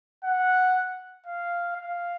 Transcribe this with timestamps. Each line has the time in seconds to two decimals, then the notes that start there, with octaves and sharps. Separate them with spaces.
0.24 F#5
1.26 F5
1.76 F5